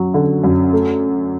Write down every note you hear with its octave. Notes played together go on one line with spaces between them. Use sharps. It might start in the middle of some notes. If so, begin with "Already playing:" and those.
Already playing: F#2 F#3
D3
F#2
A3